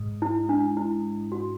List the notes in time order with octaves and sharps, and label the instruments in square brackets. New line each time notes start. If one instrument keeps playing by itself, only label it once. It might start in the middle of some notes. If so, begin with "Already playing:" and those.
Already playing: [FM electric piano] G#2 G#3
[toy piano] E4
D4
E4
F#4